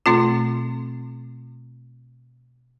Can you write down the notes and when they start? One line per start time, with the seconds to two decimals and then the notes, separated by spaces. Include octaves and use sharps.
0.06 B2 A3 C4 F4